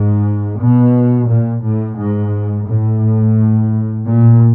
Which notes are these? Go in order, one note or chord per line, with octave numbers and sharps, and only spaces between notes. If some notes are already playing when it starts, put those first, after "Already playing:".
Already playing: G#2
B2
A#2
A2
G#2
A2
A#2